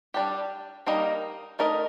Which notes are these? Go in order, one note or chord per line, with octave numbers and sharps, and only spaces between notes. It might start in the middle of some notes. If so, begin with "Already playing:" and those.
G3 D4 G4
G3 A#3 D#4 A#4 D#5
A3 D#4 A#4 D#5